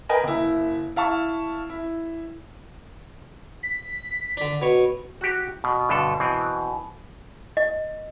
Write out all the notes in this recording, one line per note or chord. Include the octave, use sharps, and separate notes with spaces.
A#4 B4 D#5 G5 G#5
F#1 E4
E4 F5 A5 C#6
E4
B6
D3 D4
B2 C#5
F#4 G4
B2
G2 B2 D3 A4
B2 E3 C4
D#5